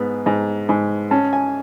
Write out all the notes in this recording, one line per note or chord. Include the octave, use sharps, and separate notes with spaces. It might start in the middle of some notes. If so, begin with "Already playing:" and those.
Already playing: G#2 B3
G#2
G#2
C#4 A5
G#5